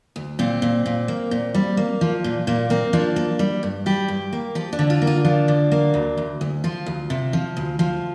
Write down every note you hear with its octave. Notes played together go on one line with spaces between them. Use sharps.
D2
A#2 C4
A#2
A#2
A#3
A#2
G3
A#3
F3
A#2
A#2 A#3
A#3 C4
F3 D4
A#3
G3
G2
G3 G4
G2
A#3
F3 G4
D4
D3
F4
A#3
F4
F3 D4
D3
A#3
D2
D2
D2
F3 F4
D2
C3
F3
D2
F3